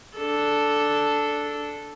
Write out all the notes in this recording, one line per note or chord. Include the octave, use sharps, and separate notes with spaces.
D4 A4